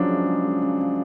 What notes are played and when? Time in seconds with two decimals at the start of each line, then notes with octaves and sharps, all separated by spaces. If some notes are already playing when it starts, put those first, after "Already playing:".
Already playing: C#3 F3 F#3 C#4 D4
0.08 G#3
0.26 G#3
0.44 G#3
0.62 C#3
0.81 C#3